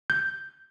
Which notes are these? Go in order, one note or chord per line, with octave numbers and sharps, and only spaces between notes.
G6